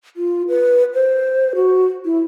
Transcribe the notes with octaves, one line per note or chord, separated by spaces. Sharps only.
F4
B4
C5
F#4
E4